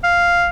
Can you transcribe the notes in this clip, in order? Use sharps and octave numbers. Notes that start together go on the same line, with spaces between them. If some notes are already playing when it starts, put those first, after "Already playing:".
F5